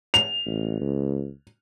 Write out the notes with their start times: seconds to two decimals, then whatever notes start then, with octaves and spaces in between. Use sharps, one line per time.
0.14 F7
0.46 A1
0.80 C#2